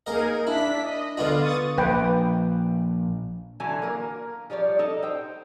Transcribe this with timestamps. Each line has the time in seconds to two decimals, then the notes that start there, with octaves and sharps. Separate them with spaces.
0.06 A#3 D#4 G#4 A#4 D#5
0.47 D4 E4 B6
0.84 D#5
1.17 D3 B3 D4 F4
1.42 C#6 D#6 A6
1.78 A#1 B4 G5
3.60 D3 E3 F#3 A4 G#5
3.82 A#3 A#4
4.50 F3 G3 C#5 D5
4.79 D#4 A4
5.03 C5 G5